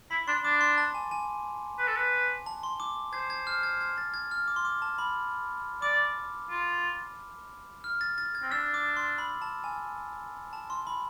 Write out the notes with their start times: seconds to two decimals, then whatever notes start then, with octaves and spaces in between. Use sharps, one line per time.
0.11 E4 B5
0.27 D4 C6
0.44 D4 D6
0.61 C6
0.78 A5
0.95 G#5
1.11 G#5
1.79 B4
1.88 A4
1.96 B4
2.46 A5
2.63 C6
2.80 D6
3.13 C5 G#6
3.30 G#6
3.47 F6
3.63 G#6
3.81 G#6
3.98 A6
4.14 G#6
4.31 F6
4.48 D6
4.56 C6
4.65 D6
4.82 A5
4.98 B5
5.82 D5 D6
6.50 F4
7.84 F6
8.01 A6
8.18 A6
8.35 G#6
8.42 C4
8.52 D4 E6
8.74 D6
8.97 C6
9.18 B5
9.42 A5
9.64 G#5
10.53 A5
10.70 C6
10.87 B5